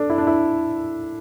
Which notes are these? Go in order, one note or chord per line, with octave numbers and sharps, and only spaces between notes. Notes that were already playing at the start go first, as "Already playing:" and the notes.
Already playing: D4 A4
E4
D4
E4